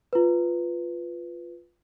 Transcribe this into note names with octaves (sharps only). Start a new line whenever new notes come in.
F4 B4